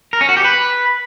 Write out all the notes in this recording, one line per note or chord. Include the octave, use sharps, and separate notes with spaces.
A#4
C#4
F#4
G4
B4